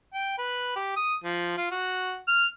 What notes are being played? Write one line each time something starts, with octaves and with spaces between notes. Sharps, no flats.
G5
B4
G4
D#6
F3
F4
F#4
F6